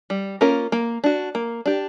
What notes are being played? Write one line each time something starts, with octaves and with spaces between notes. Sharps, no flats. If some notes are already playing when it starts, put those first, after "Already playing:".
G3
A#3 C#4 F4 A#4
A#3
D4 F#4
A#3
D4 G4